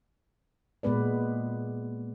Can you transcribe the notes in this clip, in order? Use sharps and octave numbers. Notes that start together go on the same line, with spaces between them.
A#2 G#3 B3 B4 D5